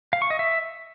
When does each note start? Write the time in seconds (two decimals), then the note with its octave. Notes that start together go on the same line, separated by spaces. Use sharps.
0.13 F5
0.22 C#6
0.30 D#5
0.39 E5